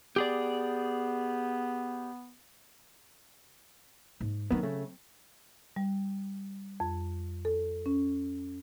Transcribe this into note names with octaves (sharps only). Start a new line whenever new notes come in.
B3 G4 G#4 D5
G#2
D#3 F#3 B3 C4
C#3 A3
G3
F2
A4
C#4